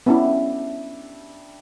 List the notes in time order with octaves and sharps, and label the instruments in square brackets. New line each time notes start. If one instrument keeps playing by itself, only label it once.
[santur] G3 D4 E5 [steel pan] B3 C#4 E4